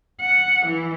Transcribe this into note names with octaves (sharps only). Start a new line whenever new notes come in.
F#5
E3